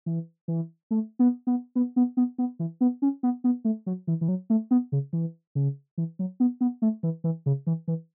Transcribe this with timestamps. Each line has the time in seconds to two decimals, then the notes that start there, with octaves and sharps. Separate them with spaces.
0.06 E3
0.48 E3
0.91 A3
1.19 B3
1.47 B3
1.76 B3
1.96 B3
2.17 B3
2.38 B3
2.59 E3
2.81 B3
3.02 C#4
3.23 B3
3.44 B3
3.65 A3
3.86 F#3
4.07 E3
4.21 E3
4.28 F#3
4.50 A3
4.71 B3
4.92 C#3
5.13 E3
5.55 C#3
5.97 E3
6.19 F#3
6.40 B3
6.61 B3
6.82 A3
7.03 E3
7.24 E3
7.46 C#3
7.67 E3
7.88 E3